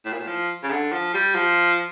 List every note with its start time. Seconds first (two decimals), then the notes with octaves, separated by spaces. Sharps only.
0.05 A2
0.13 A#2
0.19 A2
0.27 F3
0.63 C#3
0.71 D3
0.92 F3
1.14 G3
1.35 F3